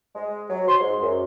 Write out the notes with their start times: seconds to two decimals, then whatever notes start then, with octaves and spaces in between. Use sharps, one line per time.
0.15 G#3
0.49 F#3
0.68 C6
0.81 G#2
1.02 F#2